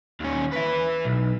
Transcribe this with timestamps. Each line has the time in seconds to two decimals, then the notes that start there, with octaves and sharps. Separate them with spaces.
0.20 D#2 C#4
0.53 B4 E5
1.05 B1